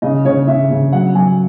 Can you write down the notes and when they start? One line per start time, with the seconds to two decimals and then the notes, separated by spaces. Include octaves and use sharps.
0.02 C#3 D#5
0.25 C#3 C#5
0.47 C#3 E5
0.70 C#3
0.92 F#3 F#5
1.15 F#3 G#5